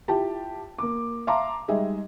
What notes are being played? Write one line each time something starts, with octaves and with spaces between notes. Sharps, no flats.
E4 F4 G4 A5
A#3 D6
E5 F5 A5 A#5 C6 D6
G3 G#3 D#4 G#4 D#5 E5